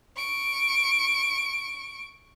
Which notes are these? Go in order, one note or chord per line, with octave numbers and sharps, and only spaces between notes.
C#6 D7